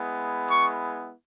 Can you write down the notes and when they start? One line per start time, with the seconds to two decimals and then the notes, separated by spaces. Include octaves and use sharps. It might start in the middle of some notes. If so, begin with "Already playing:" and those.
Already playing: G#3 B3 E4
0.50 C#6